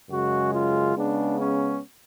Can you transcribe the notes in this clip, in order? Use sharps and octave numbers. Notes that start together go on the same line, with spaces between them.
F#2 C#3 G#3 F#4
F4
C#3 G#3 B3 D4
C#4